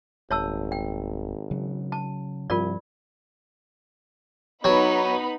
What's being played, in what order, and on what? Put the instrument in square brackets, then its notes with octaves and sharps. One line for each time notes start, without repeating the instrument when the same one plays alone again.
[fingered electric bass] D#1 [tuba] G#1 [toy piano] C#5 A5 E6
[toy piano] G5
[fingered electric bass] C#3 F#3
[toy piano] A5
[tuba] C2 [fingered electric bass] G2 F3 G3 [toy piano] F4 A#4 D5
[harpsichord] F#3 [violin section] B3 D#4 B5